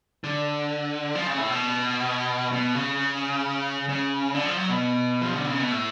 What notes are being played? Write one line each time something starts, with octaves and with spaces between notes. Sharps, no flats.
D3
F3
C#3
A2
B2
B2
C#3
C#3
D3
F3
F#3
B2
F3
D3
C#3
B2
A2